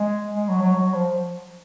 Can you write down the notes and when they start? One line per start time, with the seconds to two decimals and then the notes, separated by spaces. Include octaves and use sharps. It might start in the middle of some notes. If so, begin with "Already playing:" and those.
Already playing: G#3
0.34 G#3
0.48 F#3
0.61 F#3
0.75 F#3
0.94 F3